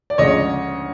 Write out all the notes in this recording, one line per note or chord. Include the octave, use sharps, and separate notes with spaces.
D5
D2 C#3 F3 G#3 C#5 D#5